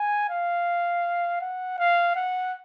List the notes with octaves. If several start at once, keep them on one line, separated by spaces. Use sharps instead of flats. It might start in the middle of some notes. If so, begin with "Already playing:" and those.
Already playing: G#5
F5
F#5
F5
F#5